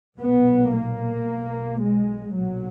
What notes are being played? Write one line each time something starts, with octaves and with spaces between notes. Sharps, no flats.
B1 A#2 B3
A#3
B1 B2
G#3
B1 A#2 F#3